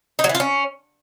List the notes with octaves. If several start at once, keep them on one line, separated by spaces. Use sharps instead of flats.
D#4
F#3
E3
F4
C#4